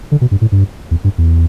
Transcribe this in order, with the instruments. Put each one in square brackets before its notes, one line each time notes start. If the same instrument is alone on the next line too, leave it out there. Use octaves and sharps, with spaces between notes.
[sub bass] D3
B2
G2
A2
G2
E2
G2
E2